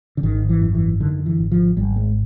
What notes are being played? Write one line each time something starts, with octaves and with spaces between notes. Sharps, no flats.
D3
G#1 D#3
E3
F#2
E3
D3 D#3
E3
G#1
F3
G#1 G3
G#3